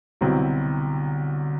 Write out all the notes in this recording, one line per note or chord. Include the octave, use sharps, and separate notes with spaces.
C2 B2 D3 F#3 C4 E4